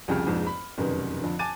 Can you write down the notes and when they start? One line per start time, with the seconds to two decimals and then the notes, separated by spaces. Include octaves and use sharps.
0.08 C2 F2 C#3 G4 G5 F6
0.27 F1 A#1 F2 G#2
0.47 B5
0.78 F1 F#2 B2 D#3
1.21 F2 D3
1.39 G#5 A5 D6 A6 D#7